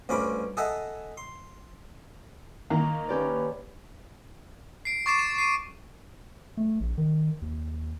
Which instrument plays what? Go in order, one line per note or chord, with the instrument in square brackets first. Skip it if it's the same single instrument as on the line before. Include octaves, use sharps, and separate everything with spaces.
[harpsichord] D2 G2 C#4 F4 B5 D6
G#4 A4 D#5 E5 F#5
C6
[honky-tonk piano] D#3 A#3 [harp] A#5
[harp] C#4 G4 D5 [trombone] B4
[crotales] C7 D7
C#6 D6 A6 C7 D7 E7
E7
C7 D#7
[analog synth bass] A3
A#1
D#3
D#2